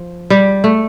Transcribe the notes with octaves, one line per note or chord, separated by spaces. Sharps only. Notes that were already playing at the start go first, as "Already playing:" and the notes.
Already playing: F3
G3
A3